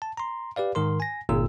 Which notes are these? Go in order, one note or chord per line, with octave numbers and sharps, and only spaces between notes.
A5
A#5 C6
G4 B4 D5 F5
G#2 D#3 A#4 C6
G#5 A#6
G1 A#2 G#4 E6